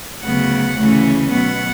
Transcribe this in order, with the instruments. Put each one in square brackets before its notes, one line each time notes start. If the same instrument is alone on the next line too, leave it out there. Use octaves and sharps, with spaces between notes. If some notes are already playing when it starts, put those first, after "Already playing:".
[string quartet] D2 C#3 F#3 B3 F#5
D2 C#3 E3 A3 C#4
B2 F#3 B3 F#5